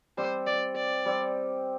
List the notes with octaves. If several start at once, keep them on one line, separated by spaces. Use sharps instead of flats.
G3 C4 G4 C5
D5
D5
G3 C4 G4